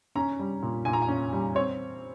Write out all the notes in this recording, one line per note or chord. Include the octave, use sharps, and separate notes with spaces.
C#4 A#5
G3
A#2
A#2 G#5
A#5
G#5
C#4
G3
C4 C#5